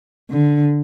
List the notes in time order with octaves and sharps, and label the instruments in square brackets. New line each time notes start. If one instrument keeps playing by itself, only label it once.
[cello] D3